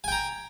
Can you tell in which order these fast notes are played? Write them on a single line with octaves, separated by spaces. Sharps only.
G#5 G5 A#5